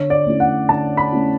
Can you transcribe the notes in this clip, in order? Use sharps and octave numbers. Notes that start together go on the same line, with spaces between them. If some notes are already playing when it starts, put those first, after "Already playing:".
Already playing: D3 C#5
D5
A3 C#4 E4
F#5
D3 A5
B5
A3 C#4 E4